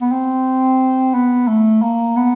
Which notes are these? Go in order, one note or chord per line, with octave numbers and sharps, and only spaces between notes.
B3
C4
B3
A3
A#3
B3